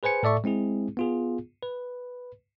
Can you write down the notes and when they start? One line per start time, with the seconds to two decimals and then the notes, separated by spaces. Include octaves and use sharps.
0.03 G#4 B4 C5 G#5 C#7
0.23 A2 A4 D5 E5 C#6
0.44 G#3 C4 E4 G#4
0.97 B3 F4 G#4
1.63 B4